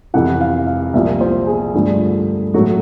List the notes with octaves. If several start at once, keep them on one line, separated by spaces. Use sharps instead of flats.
F2 C3 E3 F#5
F5
F5
C2 A#2 F3 E5
C5
G#4
G2 D3 F3 A3
A2 F#3 A3 F#4